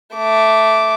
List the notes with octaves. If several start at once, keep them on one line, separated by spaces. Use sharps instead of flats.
A3 D6